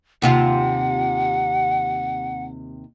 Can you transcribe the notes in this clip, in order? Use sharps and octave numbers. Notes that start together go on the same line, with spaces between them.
D#2 C3 F4 F#5